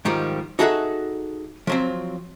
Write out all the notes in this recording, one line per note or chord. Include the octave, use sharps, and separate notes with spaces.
G#2 D#3 F3 G3
D#4 F#4 G#4 A4 E5 F#5
F3 F#3 C4